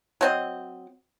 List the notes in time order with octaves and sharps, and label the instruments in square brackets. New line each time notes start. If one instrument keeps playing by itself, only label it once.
[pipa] F#3 C4 D#5